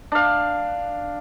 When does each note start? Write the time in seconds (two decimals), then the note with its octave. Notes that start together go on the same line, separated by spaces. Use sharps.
0.12 D4 F5